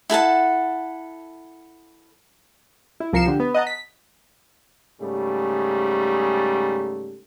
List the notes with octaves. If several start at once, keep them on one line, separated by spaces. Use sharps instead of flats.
E4 A4 F#5 A5
E4
C2 F3 A#4 C7 C#7 E7
D3 G4
B3
D#5 F#5 A5 A#5
B6
G#2 C#3 G3 A3